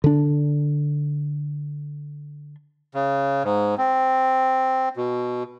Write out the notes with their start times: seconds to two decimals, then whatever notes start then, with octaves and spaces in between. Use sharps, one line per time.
0.04 D3 D4
2.95 C#3
3.44 G#2
3.78 C4
4.97 B2